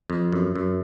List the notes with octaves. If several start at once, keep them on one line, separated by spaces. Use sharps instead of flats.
F2
F#2
F#2